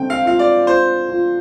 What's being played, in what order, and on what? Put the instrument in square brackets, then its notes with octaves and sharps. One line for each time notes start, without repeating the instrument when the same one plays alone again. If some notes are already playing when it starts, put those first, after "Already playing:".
Already playing: [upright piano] D3 C4 [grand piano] G5
[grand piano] F5
[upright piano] F4 [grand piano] F5
[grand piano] D5
[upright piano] F4 [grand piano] C5
[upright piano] F4